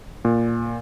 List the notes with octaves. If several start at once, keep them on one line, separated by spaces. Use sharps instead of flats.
A#2